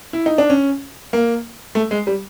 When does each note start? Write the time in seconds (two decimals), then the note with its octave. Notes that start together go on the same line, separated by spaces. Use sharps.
0.13 E4
0.26 D#4
0.38 D4
0.50 C#4
1.13 A#3
1.75 A3
1.91 G#3
2.07 G3